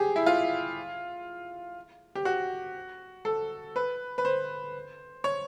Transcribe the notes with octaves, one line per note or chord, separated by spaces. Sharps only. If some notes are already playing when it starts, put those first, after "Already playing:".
Already playing: G4 G#4
E4
F4
G4
F#4
A4
B4
B4
C5
C#5